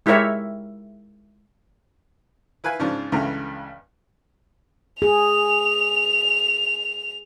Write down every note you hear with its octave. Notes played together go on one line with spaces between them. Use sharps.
G#3 E4 G4 A#4 C#5 E5
E4 B4 F5 G#5
G#2 C#3 F3 D4
C#2 G2 C#3 E3 A4 A#5
G#4 F7